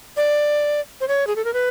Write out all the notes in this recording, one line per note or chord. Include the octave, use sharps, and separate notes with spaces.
D5
C5
C#5
G#4
A4
A#4
B4